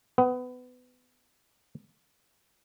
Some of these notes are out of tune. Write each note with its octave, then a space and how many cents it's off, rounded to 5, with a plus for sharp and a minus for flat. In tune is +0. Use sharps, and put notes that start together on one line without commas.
B3 +25